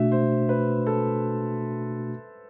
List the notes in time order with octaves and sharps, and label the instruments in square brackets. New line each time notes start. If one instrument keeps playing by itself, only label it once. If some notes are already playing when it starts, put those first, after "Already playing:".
Already playing: [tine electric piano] B2 A3 D4 F#4 [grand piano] E5
[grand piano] C5
B4
A4